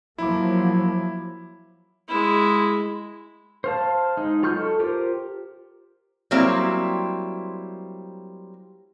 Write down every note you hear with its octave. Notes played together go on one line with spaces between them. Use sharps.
F3 F#3 A#3 E4 D6
G#3 E4
C5 F5 A5
G#3 D#4
F#3 F4 C#6 F6 G6
A4
F4 G4 A#4 C5
F#3 G3 A#3 C4 E4 G4